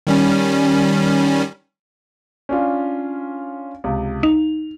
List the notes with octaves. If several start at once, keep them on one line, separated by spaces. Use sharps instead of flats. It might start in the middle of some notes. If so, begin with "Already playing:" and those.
D#3 G3 C#4
C#4 D4 F4
C#2 C3
D#4 F7